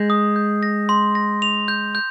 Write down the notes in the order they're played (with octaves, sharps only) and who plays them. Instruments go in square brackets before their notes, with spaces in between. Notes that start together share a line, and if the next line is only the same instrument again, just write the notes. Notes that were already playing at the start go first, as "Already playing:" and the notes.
Already playing: [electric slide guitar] G#3 [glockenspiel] G6
[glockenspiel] D#6
G6
A#6
C6
A#6
F7
G6
G6